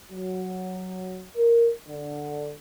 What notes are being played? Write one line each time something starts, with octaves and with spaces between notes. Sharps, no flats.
F#3
A#4
D3